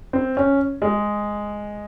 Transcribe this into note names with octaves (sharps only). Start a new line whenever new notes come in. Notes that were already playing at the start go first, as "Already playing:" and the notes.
C4
C#4
G#3